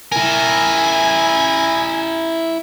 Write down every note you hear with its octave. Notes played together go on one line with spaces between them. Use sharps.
E4 A#4 G#5